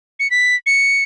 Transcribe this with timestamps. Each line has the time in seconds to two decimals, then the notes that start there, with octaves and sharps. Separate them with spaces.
0.20 C#7
0.31 B6
0.66 C#7